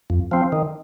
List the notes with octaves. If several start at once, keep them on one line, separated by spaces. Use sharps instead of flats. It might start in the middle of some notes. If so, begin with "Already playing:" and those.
F2
F3 C4
D#3